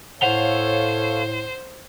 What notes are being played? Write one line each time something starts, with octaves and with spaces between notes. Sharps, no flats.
A2 A4 C5 C#5 F5 F#5 F7 G7